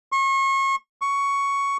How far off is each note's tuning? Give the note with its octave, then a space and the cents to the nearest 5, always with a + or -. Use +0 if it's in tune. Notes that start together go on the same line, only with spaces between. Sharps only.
C#6 -35
C#6 +10